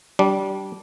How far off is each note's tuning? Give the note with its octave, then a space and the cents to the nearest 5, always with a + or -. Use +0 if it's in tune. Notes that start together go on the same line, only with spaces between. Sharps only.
G3 -20 D4 -15